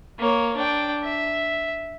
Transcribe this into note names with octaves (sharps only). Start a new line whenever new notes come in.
A#3 C#5
D4 G5
E5